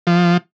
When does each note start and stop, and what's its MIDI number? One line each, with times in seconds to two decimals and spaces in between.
0.07 0.37 53